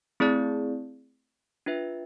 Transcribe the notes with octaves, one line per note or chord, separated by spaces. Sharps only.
A3 C4 E4 G#4 D5
D4 F4 B4 E5